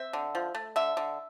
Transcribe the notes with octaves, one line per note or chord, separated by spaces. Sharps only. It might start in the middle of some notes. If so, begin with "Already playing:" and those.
Already playing: C4 E5
D3
F3
A3
D3 E5
D3